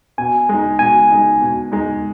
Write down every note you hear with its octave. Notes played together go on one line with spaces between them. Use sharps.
B2 G#5
G#3 D#4
B2 G#5
G#3 D#4
B2
G#3 D#4